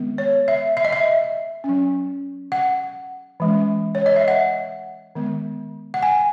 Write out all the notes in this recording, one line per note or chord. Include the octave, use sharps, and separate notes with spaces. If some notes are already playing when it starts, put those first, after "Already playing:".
Already playing: D#3 G#3 B3
C#5
E5
E5
D#5
E5
C#4
F#3
F#5
E3 G#3 C#4
C#5
D#5
E5
F#5
D#3 G#3 B3
F#5
G#5